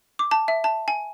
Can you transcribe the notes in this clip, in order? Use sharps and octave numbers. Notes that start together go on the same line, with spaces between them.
D6
A5
E5
A5
G#5